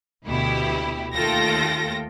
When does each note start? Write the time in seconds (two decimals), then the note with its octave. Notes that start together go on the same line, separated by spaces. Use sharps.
0.24 D2 B2 E4 G4
1.15 D#2 A3 F4 A4 G5 A#6